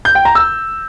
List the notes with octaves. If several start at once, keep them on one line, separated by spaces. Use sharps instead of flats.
G6
G5
A#5
E6